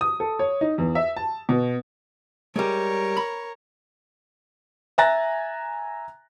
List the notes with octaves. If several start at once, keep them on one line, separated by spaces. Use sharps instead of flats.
D#6
A4
C#5
D#4
E2
E5
A5
B2
G3 G#3 A#4 C#5
B5
E5 G#5 A#5 F#6 A6 A#6